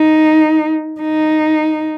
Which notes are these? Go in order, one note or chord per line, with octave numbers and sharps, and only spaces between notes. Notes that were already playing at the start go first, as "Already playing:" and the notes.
Already playing: D#4
D#4